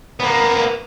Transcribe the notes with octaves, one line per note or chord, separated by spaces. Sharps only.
A#3 B3